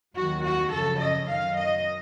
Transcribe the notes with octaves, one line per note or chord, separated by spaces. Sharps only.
D#2 D#3 F#3 F#4
F#4
F#2 C#3 F3 A4
D#5
F#2 D#3 F#3 F5
D#5